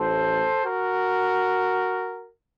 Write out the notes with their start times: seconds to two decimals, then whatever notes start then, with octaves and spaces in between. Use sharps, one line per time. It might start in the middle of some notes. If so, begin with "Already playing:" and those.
Already playing: A1 A2 A4 C5
0.65 F#4 A#4